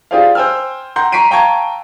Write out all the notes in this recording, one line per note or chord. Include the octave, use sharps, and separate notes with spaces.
F4 G4 G#4 C5 D5 F5
C5 G5 G#5 E6 F6
F#5 G5 A#5 C6 G6
A#5 C#6 B6 C7 D7 D#7
F5 G5 A5 A#5 C#6 G#6